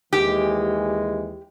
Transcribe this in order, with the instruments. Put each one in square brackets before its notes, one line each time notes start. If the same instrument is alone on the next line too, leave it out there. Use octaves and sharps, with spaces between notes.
[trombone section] D#2 E3 G#3 [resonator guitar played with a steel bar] G4